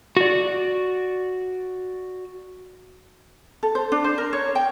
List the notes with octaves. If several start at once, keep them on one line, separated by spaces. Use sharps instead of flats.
F#4 D5
A4
C5
D4
C5
A#4
C#5
G5